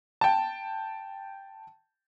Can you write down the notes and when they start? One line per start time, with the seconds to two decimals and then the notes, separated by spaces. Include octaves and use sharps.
0.21 G5 A5